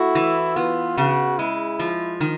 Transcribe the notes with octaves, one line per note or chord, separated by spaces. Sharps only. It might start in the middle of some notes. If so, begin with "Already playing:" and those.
Already playing: A3 E4 F#4
E3
B3 F4
C#3 F#4
G#3 E4
F3
D#3